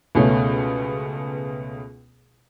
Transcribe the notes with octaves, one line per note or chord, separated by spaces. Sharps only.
C#2 B2 A3 C#4